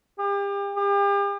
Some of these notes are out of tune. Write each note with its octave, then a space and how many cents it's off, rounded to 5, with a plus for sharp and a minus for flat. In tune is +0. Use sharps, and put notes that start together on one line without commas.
G4 +35
G4 +40